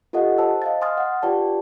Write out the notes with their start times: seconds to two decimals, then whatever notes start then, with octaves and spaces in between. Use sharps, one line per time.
0.13 F4 G4 A4 D#5 F#5
0.38 C5 A5 E6
0.62 D#5 F5 A6
0.81 G#5 C6 D#6 F6 A6
0.98 F#5
1.22 F4 G4 B4 D5 G5 A5